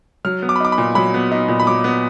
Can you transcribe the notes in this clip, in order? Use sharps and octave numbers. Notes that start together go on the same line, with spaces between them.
F#3 F6
B3
D6
B5
D#4 D6
B5
A#2
F#3 B5
B3
D#4
A#2
B5
F#3 D6
B3